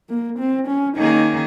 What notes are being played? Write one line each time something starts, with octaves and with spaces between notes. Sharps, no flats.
A#3
C4
C#4
D#3 A#3 C#4 D#4 G#4